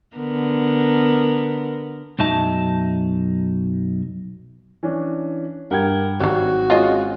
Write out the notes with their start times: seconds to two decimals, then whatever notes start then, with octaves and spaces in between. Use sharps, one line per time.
0.17 D3 B3 A#4
2.19 B1 F#2 F#3 D#4 E5 A5
4.83 E3 C#4 D4
5.71 G2 A#4 F#5 G5 G#6
6.20 G#1 F#3 G3 F#4
6.70 G#3 C#4 F4 D#5 G#5